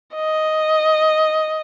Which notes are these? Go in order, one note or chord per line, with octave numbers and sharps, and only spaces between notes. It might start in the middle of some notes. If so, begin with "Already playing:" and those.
D#5